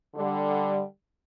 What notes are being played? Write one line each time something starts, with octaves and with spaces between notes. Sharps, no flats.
D3 G3